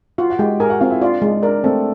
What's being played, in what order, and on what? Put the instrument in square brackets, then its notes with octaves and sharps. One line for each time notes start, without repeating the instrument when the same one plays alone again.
[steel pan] F4 [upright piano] F#4 F#5
[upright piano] F#5
[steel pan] G#3 [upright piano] G4 G5
[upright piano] G#4 G#5 [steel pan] A#4
[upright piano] F#4 F#5
[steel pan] C4 [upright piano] F4 F5
[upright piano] E4 E5
[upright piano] D4 D5 [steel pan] F4
[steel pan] G#3
[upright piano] D4 D5 [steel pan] A#4
[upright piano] A3 A4 [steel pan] C4